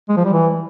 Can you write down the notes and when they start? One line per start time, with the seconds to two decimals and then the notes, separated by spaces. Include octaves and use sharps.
0.09 G#3
0.17 F3
0.25 G3
0.33 E3